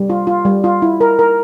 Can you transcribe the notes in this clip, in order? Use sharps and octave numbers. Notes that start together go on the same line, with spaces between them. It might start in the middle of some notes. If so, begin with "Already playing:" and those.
Already playing: G3
F4
F4
G3
F4
E4
A#4
A#4